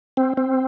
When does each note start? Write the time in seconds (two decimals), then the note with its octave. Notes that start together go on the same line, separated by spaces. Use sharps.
0.17 C4
0.37 C4